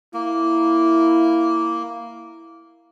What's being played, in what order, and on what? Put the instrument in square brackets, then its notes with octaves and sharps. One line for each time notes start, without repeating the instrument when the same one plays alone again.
[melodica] A#3 [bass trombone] E4